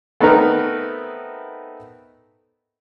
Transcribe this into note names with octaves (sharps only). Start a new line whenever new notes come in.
A3 B3 C4 D#4 A#4 B4